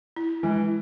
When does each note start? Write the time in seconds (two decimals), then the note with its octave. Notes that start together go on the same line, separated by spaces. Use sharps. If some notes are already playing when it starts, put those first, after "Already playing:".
0.16 E4
0.43 E3 G#3